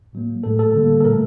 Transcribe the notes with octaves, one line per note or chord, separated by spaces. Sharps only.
A2 F#3 A#3
A2 A3 A4
A4
D3 G3 A#3
A4
A#2 A3 A#4